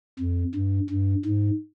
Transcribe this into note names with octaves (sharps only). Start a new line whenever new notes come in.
F2
G2
G2
G#2